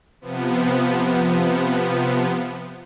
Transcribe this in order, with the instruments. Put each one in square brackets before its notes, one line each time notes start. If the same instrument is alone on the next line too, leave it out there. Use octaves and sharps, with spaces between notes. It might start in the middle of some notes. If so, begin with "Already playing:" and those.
[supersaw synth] C3 F3 B3